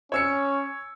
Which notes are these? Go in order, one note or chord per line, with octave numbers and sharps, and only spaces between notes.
C#4 C#5 E6 C#7